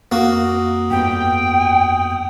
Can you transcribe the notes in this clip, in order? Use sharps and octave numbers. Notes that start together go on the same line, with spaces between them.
F2 A#3 F#4 D#6
G2 B3 G5